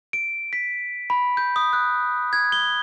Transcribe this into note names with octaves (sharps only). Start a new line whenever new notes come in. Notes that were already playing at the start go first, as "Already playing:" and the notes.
D7
B6
B5
G6
D#6
F#6
G#6
G7